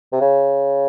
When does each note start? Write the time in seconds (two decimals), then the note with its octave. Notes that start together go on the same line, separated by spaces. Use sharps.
0.13 C3
0.21 C#3